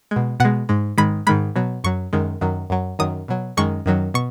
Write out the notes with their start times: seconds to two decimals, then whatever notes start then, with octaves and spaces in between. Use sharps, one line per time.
0.11 B2 G#3
0.40 B2 G#3 F#5
0.69 G#2 G#3
0.98 G#2 D#3 G#3 B5
1.27 G#2 D#3 G#3 B5
1.56 B2 F#3
1.84 F#2 F#3 C#6
2.13 F#2 D#3 G#3
2.41 F#2 D#3 F#3
2.70 F#2 F#3
2.99 F#2 D#3 F#3 D#6
3.28 B2 F#3
3.57 F#2 D#3 G#3 C#6
3.86 F#2 D#3 F#3
4.14 B2 C#6